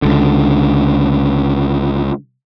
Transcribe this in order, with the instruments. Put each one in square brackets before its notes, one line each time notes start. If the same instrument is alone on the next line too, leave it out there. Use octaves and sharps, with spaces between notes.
[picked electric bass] C#2 D3